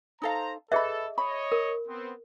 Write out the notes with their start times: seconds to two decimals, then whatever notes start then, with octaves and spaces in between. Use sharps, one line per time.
0.22 D#4 A4 C5 F5 A#5
0.72 G#4 A4 B4 D#5 E5 B5
1.18 C#5 D#5 B5 C#6
1.52 A#4
1.88 B3 C4